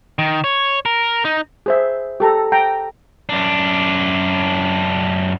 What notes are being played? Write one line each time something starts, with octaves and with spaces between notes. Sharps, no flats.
D#3
C#5
A#4
D#4
G#4 C5 E5
G4 A4 A#5
G5 A#5
F#2 D4